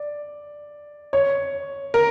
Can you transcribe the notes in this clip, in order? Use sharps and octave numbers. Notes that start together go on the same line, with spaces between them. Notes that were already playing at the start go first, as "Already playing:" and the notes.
Already playing: D5
C#5
A#4